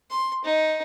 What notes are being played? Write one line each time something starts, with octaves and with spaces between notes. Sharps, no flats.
C6
D#4